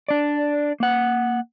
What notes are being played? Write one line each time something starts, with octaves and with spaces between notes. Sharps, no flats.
D4 D5
A#3 F#5